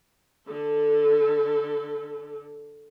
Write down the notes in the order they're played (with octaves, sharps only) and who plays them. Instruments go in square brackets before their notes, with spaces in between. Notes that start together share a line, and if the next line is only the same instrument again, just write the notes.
[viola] D3 A4